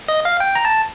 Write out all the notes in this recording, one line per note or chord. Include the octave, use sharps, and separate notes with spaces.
D#5
F5
G5
A#5
A5